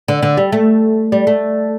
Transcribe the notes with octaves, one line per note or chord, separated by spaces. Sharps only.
D3
D3
G3
A3
G3
A3